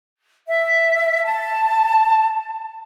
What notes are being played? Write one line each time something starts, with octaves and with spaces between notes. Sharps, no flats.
E5
A5